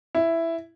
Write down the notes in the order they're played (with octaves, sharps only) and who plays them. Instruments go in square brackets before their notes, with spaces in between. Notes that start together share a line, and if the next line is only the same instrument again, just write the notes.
[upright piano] E4